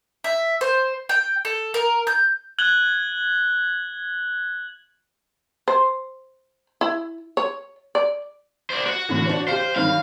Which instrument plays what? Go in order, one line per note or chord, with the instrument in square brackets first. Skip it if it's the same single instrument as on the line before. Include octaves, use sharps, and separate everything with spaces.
[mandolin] E5
C5
G5
A4
A#4
G6
[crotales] F#6 G#6 F#7 G7
[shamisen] C5
E4
C#5
D5
[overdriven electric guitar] C5 D5
F#4
[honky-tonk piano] A2 D3 E3
D4 C5 C#5
[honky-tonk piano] G4 F5 [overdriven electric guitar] C5
[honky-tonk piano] G2 D#3 F#3 [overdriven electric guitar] F5